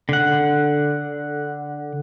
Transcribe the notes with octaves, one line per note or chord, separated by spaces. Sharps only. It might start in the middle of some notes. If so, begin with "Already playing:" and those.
D3 F#5